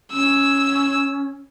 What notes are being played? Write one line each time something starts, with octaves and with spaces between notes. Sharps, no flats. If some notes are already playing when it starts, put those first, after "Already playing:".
C#4 E6